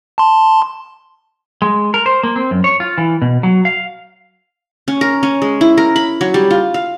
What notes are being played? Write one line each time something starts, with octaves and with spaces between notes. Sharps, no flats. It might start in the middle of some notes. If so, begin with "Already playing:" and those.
A5 C6
G#3
A#4
C5
A#3
C4
F#2
C#5
F4
E3
B2
F#3
F5
C#4
A#4
C#4
G#3
E4
A#4
B5
F#3
G3
F4
F5